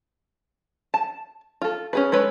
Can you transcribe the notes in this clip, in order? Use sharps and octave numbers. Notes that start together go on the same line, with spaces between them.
A5
F4 A4
C#4 G#4 B4
G#3 A4 B4 C#5